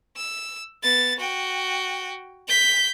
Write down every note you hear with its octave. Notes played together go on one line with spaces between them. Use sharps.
E6
B3 A6
F#4 G5
G6 B6